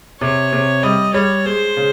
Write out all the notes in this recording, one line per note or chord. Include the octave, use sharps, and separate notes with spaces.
C3 C#5
C3
G3 D#5
G3 C#5
G#3 C5
C#3